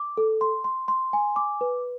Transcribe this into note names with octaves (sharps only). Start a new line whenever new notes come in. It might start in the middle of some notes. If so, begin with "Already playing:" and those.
Already playing: D6
A4
C6
C6
C6
G#5
D6
B4